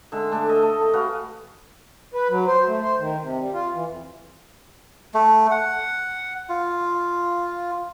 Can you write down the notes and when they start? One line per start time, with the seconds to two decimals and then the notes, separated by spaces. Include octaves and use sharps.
0.12 D3 G#3 E5
0.31 A3 D4 A4
0.49 D#5
0.62 A3
0.81 G4
0.93 F#4 G#4 B4 F5
2.14 B4
2.30 F#3
2.47 C5
2.68 A3
2.82 C5
2.99 D#3
3.21 C3
3.40 G3
3.54 F4
3.74 E3
3.89 F2
5.14 A3
5.51 F#5
6.49 F4